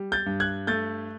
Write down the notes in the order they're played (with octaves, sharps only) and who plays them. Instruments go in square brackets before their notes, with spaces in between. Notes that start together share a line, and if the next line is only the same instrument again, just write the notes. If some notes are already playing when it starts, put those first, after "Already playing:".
Already playing: [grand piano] G3
G6 A6
G2
F#6 G#6
A3 G6 A6